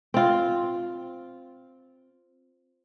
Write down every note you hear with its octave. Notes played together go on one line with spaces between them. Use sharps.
C4 F4